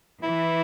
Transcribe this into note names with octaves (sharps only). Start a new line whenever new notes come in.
E3 E4